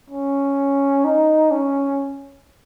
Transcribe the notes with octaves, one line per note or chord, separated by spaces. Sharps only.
C#4
D#4
C#4